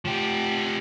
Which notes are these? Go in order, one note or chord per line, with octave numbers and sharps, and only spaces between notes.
F3 G4